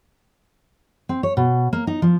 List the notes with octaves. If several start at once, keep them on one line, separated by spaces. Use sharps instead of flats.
C4
C#5
B2
A#3
D#4
F3